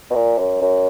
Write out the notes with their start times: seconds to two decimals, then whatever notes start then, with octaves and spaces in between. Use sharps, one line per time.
0.10 B2
0.15 A#2
0.39 F#2
0.62 F#2